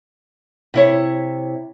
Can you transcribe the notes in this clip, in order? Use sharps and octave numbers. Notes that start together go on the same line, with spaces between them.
C3 E4 C#5